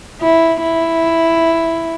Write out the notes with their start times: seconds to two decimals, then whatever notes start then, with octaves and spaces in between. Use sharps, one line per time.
0.21 E4
0.64 E4